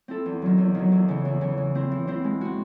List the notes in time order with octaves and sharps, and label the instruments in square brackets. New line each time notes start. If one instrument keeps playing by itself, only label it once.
[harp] C4 E4 A4
E2
D#3 F#3
E2
D#3 F#3
E2
C#3 E3
E2
C#3 E3
E3
C4 E4 C5
E3
C4 E4 C5
G#3
C4 F#4